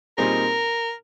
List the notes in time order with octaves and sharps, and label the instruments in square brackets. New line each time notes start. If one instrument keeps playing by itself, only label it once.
[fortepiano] A#2 G3 C4 D#4 G#4 [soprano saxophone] A#4